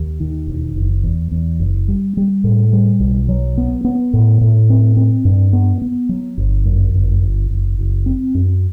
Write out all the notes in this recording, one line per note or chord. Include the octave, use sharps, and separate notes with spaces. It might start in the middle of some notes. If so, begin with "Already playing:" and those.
Already playing: D#2
D#3
E1
F#1
E2
E2
F#1
G3
G3
A2
G3
B1
F#3
B3
B3
A2
A2
C4
C4
G2
B3
B3
F#3
G1
F#2
G1
G1
F#1
F#1
C4
F#2